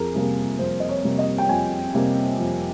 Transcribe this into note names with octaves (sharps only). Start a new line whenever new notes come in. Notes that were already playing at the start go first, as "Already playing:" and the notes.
Already playing: F2 G#4 A#4
C3 G3 A#3
F2 C5
D#5
C#5
C3 G3 A#3
D#5
G5
F2 G#5
C3 G3 A#3
F2